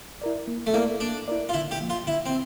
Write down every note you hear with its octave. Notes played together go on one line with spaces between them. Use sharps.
E4 A#4 D5
A#3
A3
A#3 E4 A#4 D5
A#3 D4
E4 A#4 D5
F4
D3 E4
G4
F3 A#3
F4
D3 E4
C4